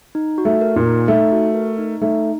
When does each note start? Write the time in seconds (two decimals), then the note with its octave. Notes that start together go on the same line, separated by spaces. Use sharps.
0.15 D#4
0.38 F#4
0.45 A3
0.61 A#4
0.76 A#2
0.85 D#4
1.08 A3 D#4
1.32 F#4
1.55 A#4
1.78 D#4
2.01 A3 D#4